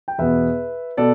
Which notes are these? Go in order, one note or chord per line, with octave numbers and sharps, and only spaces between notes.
G5
E2 B2 B3 B4 E5
B2 B3 A4 D5